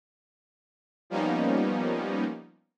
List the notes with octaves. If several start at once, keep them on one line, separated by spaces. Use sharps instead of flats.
F3 G3 A#3 B3 C#4 D#4